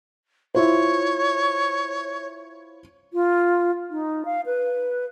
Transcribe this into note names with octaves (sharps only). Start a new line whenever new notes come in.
E4 F4 C5 C#5
F4
D#4
F5
B4